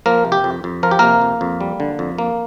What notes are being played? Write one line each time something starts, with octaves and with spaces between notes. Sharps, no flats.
F3 A#3 A#4
C3
G4
F2
F2
F3 A#4
G4
C3 A#3 A#4
F2
F2
G3
D3
F2
A#3